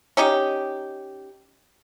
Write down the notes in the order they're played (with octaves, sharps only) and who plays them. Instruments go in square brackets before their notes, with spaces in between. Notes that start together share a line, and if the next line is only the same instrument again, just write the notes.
[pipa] C#4 D#4 G4